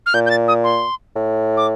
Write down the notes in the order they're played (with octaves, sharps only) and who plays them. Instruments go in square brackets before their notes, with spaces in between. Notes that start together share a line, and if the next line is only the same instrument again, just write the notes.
[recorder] F6
[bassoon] A#2 [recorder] G6
[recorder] G6
A6
D#6
C6
[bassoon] A2
[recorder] D6